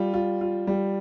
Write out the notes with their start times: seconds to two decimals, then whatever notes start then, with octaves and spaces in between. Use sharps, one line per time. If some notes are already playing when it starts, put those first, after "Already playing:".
Already playing: G3 F4
0.14 F4
0.41 F4
0.67 G3